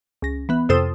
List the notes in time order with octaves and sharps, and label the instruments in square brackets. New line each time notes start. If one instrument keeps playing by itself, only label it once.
[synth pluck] C#2 A#6
E3 B3
F2 C3 A4 C5 D#6 E6